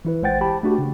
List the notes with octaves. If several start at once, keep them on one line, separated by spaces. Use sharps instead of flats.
E3 E4 B4
A1 G#3 C5 F#5 G5 A6
G4 G5 A5 B5
A3 D4 F#4 G4
C#3